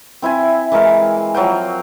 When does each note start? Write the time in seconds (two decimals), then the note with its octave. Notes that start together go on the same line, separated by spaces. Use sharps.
0.22 C4 E4 E5 G#5
0.72 E3 G#3 A#4 F5
1.35 F3 F#3 C5 G5